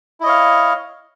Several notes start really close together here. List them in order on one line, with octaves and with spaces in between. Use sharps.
E4 D#5 C#5 F5